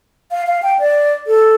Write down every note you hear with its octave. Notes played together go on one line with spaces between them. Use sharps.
F5
F5
G5
D5
A4